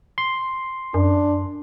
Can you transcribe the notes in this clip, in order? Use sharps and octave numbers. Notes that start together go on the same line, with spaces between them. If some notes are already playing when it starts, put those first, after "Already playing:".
C6
F#2 D4